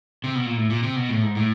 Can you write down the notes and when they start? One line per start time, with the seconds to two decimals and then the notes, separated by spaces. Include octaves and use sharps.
0.24 C3
0.35 B2
0.46 A#2
0.57 A2
0.70 A#2
0.83 C3
0.96 B2
1.09 A2
1.23 G#2
1.35 A2